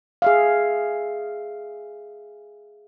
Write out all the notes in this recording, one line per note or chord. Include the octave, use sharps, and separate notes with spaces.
G#4 E5 F5